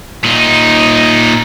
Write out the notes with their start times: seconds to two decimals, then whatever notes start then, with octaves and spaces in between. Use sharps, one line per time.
0.24 A#2 D#4